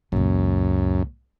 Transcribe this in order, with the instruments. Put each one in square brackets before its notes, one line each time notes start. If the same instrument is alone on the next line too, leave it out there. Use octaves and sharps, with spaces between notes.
[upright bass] C#2 A#2 [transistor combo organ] F#2